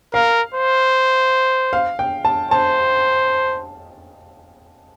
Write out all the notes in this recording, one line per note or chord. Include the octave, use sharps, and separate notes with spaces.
A#4 F5
C5
F5
G5
A5
C5 A5